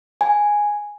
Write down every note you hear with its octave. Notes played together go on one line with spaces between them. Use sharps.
G#5